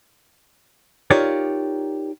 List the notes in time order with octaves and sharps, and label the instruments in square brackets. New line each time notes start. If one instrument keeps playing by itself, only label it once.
[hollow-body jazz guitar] D#4 F4 G4 A#4 C#5 D5